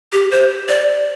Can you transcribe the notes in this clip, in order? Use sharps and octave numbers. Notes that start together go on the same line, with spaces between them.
G4
C5
D5